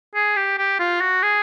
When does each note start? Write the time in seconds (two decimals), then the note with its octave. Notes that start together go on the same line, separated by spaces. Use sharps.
0.15 G#4
0.36 G4
0.58 G4
0.79 F4
1.01 F#4
1.23 G#4